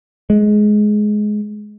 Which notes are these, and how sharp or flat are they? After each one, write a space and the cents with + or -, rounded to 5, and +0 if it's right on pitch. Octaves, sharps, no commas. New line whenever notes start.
G#3 +15